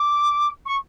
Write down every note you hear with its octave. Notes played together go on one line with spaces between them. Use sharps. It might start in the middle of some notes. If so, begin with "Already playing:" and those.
Already playing: D6
C#6